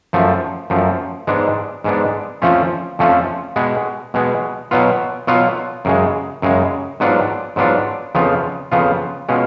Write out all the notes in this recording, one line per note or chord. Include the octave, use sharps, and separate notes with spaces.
F#2 F3 A3
F#2 F3 A3
G#2 G#3 B3 D4
G#2 G#3 B3 D4
F2 F3 A3 C#4 F4
F2 F3 A3 C#4 F4
B2 G#3 B3
B2 G#3 B3
B2 F#3 B3 F4
B2 F#3 B3 F4
F#2 C#3 G#3
F#2 C#3 G#3
G#2 F#3 B3 D4 F4
G#2 F#3 B3 D4 F4
F2 C#3 F3 B3 F4
F2 C#3 F3 B3 F4
B2 G#3 C#4 F4